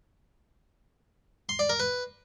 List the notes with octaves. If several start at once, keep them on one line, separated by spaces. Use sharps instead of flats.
C6
D5
A#4
B4